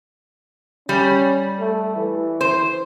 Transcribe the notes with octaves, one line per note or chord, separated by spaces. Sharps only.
G3 C#4
A3
E3
C5